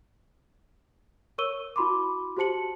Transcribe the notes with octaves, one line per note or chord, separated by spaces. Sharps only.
A#4 C#5 C#6 E6 D#7 G7
E4 F#4 B5 C6 D6
F#4 G4 C5 A5 C#7 F#7